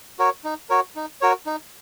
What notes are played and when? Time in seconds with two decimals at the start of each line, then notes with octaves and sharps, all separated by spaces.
0.19 F#4 A#4 C#5
0.44 D#4
0.70 F#4 A#4 C#5
0.96 D#4
1.21 F#4 A#4 C#5
1.46 D#4